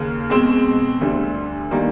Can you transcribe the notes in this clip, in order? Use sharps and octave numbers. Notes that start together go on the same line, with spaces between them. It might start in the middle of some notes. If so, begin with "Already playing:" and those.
Already playing: D#2 C#3 A#3
B2 G#3 C4
D2 D3 G3
D#3 G3 A#3 D#4